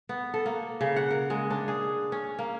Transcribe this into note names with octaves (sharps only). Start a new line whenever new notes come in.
B3
A4
A#3
C#3
F#5
A#4
G#3
D4
G#4
C#4
A#3